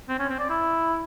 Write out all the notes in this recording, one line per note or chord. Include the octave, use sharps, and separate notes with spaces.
C4
C#4
C4
D5
E4